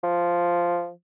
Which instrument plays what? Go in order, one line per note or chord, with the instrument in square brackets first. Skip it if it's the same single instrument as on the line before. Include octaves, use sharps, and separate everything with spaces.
[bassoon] F3